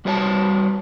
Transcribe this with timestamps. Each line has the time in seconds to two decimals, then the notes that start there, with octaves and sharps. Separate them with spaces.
0.05 G3 F#4 B4 C#5 F5 A5